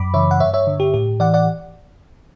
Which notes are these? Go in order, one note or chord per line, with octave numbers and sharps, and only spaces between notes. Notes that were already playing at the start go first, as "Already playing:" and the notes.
Already playing: F#2 B5 D6
C#3 E3 C#5 E5
F#5
G2 C#5 E5
C#5 E5
D3
G4
A2 G4
E3 D5 F#5
D5 F#5